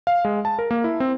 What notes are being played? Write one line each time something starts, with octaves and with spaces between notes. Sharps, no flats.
F5
G#3
A5
A#4
A#3
E4
C4